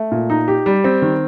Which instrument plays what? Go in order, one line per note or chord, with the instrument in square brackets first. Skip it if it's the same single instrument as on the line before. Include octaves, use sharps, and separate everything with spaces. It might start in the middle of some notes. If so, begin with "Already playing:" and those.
Already playing: [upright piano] A3
A#2
D#4
G4
G3
C4
D#3